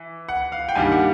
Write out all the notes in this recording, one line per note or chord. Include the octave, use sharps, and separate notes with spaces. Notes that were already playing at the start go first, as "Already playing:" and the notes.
Already playing: E3
F#5
F5
G5
G2 D#3 G3 A#3 G#5
F#5